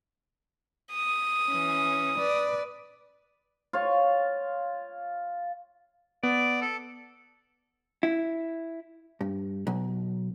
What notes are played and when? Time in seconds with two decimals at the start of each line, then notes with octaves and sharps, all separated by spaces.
0.93 D#6
1.49 E3 C#4
2.18 B4 D5
3.73 F4 C#5
6.23 B3 D5
6.62 A4
8.03 E4
9.21 G2
9.67 B1